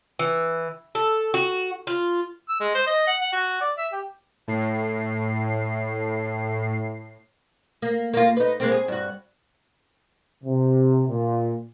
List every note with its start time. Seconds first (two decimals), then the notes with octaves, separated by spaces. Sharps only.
0.19 E3
0.95 A4
1.34 F#4
1.87 F4
2.49 E6
2.60 G#3
2.75 C5
2.87 D#5
3.07 F#5
3.21 F#5
3.33 F#4
3.61 D5
3.78 E5
3.92 G4
4.48 A2 C7
7.82 A#3
8.14 A#3 F4
8.37 D#4 B4
8.60 G#3 A#3 C4
8.72 G#4
8.88 G2 F#4
10.44 C3
11.08 A#2